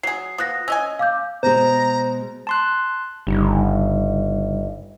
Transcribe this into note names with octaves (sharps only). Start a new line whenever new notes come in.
F#3 G#4 C7
F3 B3 D#6 F#6 A#6
C#4 D#5 G#5 E6
F5 D6 G6
B2 G#3 C5 A#5
A5 C6 F#6
G1 C#3 G3 D#4